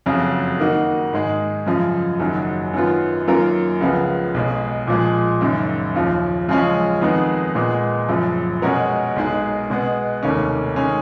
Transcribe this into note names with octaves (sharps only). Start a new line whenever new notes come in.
F#1 F2 C#3 F#3
D#3 A#3 D#4 F#4
G#2 D#3 G#3
F#2 C#3 F3
F#1 F#2 D#3 F#3
F#2 D#3 F#3 B3 F4
F#2 D#3 A#3 F4 A#4
C#2 C#3 F3 B3
B1 B2 G#3
A#2 F3 G#3
F#1 F#2 D#3
D#2 C#3 F3
F#2 C#3 F3 G#3 C#4
F2 D#3 G#3 B3 D#4
A#2 G#3 B3
F#1 F#2 F3
B2 G#3 C#4 F#4 A#4
B1 B2 G#3 D#4
B2 G#3 B3
F1 D#2 D#3 A#3 C#4
D#3 G#3 C#4